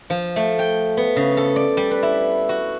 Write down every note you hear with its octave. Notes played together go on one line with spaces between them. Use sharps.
F3
A3
G5
B3
C#3
A4
D5
G3
B4
E4
F#4